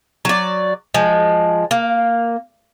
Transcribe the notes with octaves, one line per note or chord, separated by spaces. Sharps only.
F#3 D5
F3 G#3
A#3